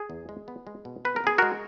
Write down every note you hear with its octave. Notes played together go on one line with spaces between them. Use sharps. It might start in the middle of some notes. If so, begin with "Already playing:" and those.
Already playing: G#4
E2
G#3
B3
G#3
B2
B3 B4
A#4
B3 G#4
G#3 F#4 A#4